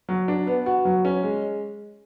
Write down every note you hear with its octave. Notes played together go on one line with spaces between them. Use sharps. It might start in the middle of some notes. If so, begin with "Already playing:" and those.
F#3
D4
B3
F#4
F#3
C#4
G#3